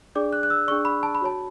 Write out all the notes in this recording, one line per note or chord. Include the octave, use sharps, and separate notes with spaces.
D4 G#4 D5 D6
F#6
F#6
E6
D4 G#4 D5 C#6
B5
A5
B5
F#4 C#5 A5